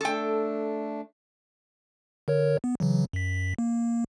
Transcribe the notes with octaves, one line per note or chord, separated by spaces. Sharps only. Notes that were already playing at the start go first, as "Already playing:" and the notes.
A3 D4 A4 G5
D3 A#4 C#5
B3
C#3 E3 F#3
F#2 B6
A#3